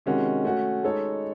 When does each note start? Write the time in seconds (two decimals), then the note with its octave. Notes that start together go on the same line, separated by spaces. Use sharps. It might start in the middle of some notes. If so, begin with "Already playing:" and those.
0.06 C3 D#3 G#3 C#4 F#4
0.45 A3 C#4 F#4
0.83 G#3 D#4 A4 C#5